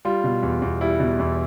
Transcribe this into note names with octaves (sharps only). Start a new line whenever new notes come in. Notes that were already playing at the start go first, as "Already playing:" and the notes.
G3 F4
B2
E2
E2
G3 E4
B2
E2